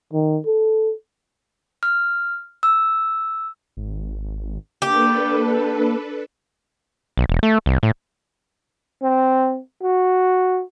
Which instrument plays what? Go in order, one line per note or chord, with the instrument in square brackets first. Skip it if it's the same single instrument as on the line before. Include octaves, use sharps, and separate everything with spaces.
[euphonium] D#3
A4
[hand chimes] F6
E6
[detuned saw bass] G#1
[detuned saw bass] A#3 [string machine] D4 A4 B4 [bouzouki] G4
[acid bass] B1
E1
A3
C2
A2
[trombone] C4
F#4